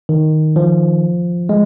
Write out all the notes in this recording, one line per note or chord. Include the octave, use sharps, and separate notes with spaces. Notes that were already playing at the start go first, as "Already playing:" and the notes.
D#3
F3
G#3